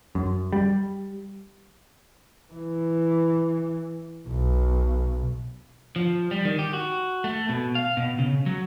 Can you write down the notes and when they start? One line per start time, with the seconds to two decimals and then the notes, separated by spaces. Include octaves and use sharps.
0.15 F#2
0.53 G3
2.52 E3
4.28 B1
5.96 F3
6.31 G3
6.45 D#3
6.59 G4
6.73 F#4
7.24 A3
7.49 B2
7.75 F5
7.97 B2
8.19 C#3
8.46 F#3